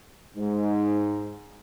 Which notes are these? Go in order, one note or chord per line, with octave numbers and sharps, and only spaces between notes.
G#2